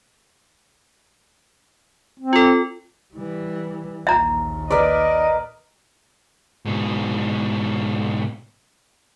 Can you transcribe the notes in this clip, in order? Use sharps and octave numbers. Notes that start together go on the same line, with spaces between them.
C4
F4 A4
E3 G3
A#1 D#2 E5 A#5
A#4 B4 D5 D#5
G#2 B2